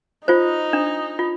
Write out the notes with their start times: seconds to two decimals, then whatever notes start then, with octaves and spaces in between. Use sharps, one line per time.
0.28 D#4 F4 C5
0.73 D4
1.19 F4